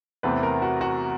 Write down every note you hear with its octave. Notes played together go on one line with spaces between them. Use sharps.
E2 C3 E3 A3 C4 B4
A#4
F#4
F#4